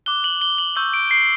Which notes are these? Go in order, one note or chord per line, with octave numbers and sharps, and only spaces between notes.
D6 F#6 G7
F#7
G7
F#7
C#6 E6 G6 F#7
D7
C7